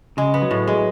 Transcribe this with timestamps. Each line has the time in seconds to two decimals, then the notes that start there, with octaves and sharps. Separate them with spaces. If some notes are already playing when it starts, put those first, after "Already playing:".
0.17 C#3 G#3
0.34 B3
0.42 F#3
0.51 A2
0.68 G#3